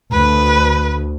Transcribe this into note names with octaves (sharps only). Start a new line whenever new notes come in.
D2 B4